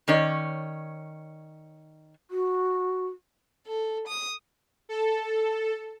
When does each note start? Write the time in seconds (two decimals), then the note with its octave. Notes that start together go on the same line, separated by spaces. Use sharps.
0.08 D#3 C#4 C#5 D5
2.31 F#4
3.67 A4
4.08 D#6
4.89 A4